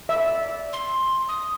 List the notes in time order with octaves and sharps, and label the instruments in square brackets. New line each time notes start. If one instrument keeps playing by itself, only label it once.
[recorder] D5 [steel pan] E5
[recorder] C6
D#6